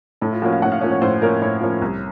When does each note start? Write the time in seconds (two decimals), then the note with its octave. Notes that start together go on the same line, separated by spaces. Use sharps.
0.21 A2 A4
0.32 F4
0.42 F3 A#3 C#4 F#4
0.53 F5
0.62 A2 F#5
0.72 F5
0.81 F3 A#3 C#4
0.92 C#5
1.02 A2 C5
1.21 F3 A#3 C#4 A#4
1.42 A2 C#5
1.61 F3 A#3 C#4
1.81 C2